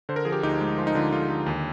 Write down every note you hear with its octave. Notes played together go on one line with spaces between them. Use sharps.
D3 C5
A#4
F3 G#4
G4 A#4
D2 D#4 G4
G#3
F3 F4
D#4
D3 F4
D3 F4
D3
D#2